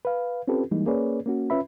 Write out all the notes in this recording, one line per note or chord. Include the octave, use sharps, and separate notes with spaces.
B4 F5
C4 C#4 F4 G4 A4 B4
E3 G3 G#3 A#3 D#4
A#3 C#4 G#4 B4 C#5 D5
A#3 C#4 F#4
C#4 F4 B4 E5 B5